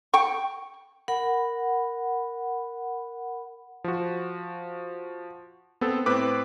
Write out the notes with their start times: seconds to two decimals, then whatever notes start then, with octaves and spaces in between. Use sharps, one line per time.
0.14 G5 C#6
1.08 A#4 F#5 B5
3.84 F3 F#4
5.81 B3 C4 A4
6.06 A2 C4 B4 D6